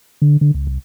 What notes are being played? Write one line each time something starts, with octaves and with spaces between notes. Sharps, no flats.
D3
D3
C#2
C2